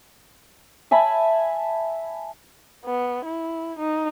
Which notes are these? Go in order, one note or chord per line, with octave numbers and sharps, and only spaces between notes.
E5 G#5 A5 B5
B3
E4
D#4